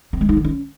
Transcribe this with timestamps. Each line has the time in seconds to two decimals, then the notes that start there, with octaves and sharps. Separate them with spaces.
0.13 C4
0.21 G#3
0.29 D#4
0.37 D#3
0.45 C#4